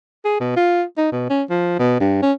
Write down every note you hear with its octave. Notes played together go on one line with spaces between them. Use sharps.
G#4
B2
F4
D#4
B2
C#4
F3
B2
G2
C#4